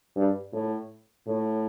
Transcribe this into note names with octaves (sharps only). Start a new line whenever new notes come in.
G2
A2
A2